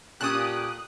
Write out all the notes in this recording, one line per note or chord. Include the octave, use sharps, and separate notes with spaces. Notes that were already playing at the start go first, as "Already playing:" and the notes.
A#2 C#4 G4 A4 A5 D#6 F#6